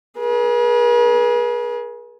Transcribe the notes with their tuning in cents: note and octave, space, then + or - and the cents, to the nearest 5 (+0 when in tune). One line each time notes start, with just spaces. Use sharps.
G#4 +20 B4 -45